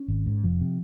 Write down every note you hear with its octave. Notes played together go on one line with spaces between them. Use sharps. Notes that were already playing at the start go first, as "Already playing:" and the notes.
Already playing: C#4
G#1
G#2
F1 F3
C3